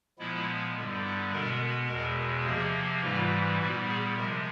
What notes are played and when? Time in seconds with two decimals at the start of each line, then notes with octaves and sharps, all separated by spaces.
0.19 A#2 F3 G#3 B3 E4
0.75 G2 D3 G3 B3
1.04 E4
1.32 B2 G#3 B3 A#4
1.89 E2 B2 G#3 A#4
2.46 C3 F3 A#3 G#4
3.03 G#2 E3 G3 F4
3.59 A#2 G3 B3 F#4
3.88 G#4
4.16 C3 F3 G#3 A#4